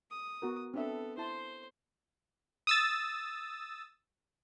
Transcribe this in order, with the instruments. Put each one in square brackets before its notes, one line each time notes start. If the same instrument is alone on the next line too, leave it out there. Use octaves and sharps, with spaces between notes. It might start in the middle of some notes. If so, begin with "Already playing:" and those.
[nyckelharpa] D#6
[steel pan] B3 F#4 A#4
[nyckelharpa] B3 A4 [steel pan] C4 D4 E5
[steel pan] E4 A5 [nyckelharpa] C5 C6
[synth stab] D#6 E6 A6